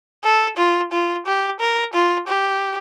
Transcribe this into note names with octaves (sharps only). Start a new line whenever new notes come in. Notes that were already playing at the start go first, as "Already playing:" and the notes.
A4
F4
F4
G4
A#4
F4
G4